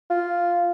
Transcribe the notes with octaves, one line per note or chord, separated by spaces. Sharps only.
F4